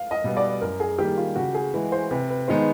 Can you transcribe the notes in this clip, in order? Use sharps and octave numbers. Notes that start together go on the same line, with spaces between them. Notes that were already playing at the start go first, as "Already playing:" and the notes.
Already playing: F5
D#5
B2 G3 B3
D5
F#2 A#4
G#4
D#3 G3 A#3 G4
F4
C#3 F#4
G#4
E3 G#3 B4
C5
C3 B4
B4
D#3 G#3 B3 D#4 C5